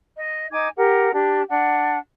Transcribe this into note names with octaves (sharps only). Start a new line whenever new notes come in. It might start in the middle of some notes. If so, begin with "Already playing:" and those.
D#5
D#4 G#5 D6 G#6
G4 A#4 F#5
D4 G4
D4 F#5